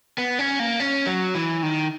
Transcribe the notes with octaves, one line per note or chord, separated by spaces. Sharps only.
B3
C#4
A#3
C#4
F#3
E3
D#3